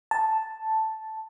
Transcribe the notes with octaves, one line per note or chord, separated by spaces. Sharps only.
A5